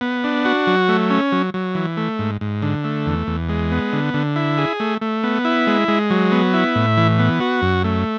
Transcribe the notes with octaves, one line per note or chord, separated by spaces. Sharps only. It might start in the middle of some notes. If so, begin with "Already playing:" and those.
B3
D4
F#4
F#3
A3
C#4
F#3
F#3
E3
A3
G#2
G#2
D3
A3
E2
E2
G#3
B3
D3
D3
E4
G#4
A3
A3
B3
E4
G#3
G#3
F#3
B3
E4
A2
E3
B3
F#4
F#2
A3